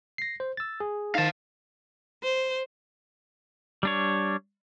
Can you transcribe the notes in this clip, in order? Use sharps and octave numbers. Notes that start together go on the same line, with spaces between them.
A#6 C7
C5
E6 A6
G#4
D#3 D#4 F5 A5
C5
G3 D4 C#5